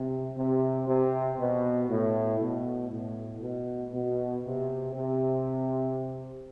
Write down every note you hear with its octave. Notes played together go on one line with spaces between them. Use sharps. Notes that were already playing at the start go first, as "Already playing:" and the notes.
Already playing: C3
C3
C3
B2
A2
B2
A2
B2
B2
C3
C3